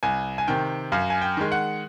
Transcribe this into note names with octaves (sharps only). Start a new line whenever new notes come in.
C2 G#5
G#5
C3 D#3 G5
F#2 F5
G#5
G5
D#3 G#3
F#5